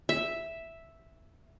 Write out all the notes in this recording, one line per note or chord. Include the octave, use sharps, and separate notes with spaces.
E5